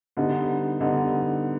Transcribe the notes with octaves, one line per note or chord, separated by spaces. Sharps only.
D3 G3 B3 D#4
D3 G3 B3 D#4